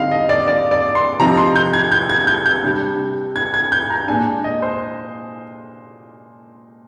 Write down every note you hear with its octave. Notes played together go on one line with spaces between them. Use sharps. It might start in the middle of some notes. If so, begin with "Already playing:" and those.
Already playing: D3 G3 C4 D#4 F5
D#5
D5
D5
D5
C6
C3 F3 C4 D#4 A#5
C6
G6
G#6
G6
G#6
G6
G6
C3 G3 D4
G#6
G#6
G6
A#5
A#2 G#3 D4 G#5
D#5
C5